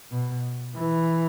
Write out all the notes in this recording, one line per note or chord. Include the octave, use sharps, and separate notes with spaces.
B2
E3